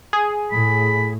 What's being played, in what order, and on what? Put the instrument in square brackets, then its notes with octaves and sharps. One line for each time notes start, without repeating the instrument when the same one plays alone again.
[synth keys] G#4
[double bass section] A2 [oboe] B5